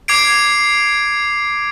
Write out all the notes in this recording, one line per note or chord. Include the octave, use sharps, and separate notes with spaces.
D6 G#6 C7 D7